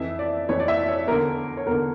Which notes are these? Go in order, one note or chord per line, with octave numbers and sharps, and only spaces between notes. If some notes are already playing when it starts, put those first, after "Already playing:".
Already playing: F2 E3 E5
D5
F2 E3 C#5
D5
E5
C#5
E2 D3 A#4
C#5
E2 D3 A#4